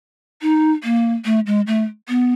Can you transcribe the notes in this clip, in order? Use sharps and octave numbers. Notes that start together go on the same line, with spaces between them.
D#4
A#3
A3
G#3
A3
B3